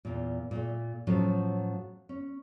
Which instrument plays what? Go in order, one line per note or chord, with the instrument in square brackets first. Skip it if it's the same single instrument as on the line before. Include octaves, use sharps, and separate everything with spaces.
[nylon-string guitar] E2 A#2
A#2 A3
A2 F3 F#3 C#4
C#4